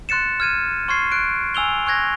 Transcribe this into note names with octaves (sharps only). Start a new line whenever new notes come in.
C6 F#6 A6 C#7 E7
F6 G#6 D#7 E7
C6 C#6 F6 G#6 C7
F#6 D7
G#5 E6 F7 G7
C#6 F#6 G#6 A#6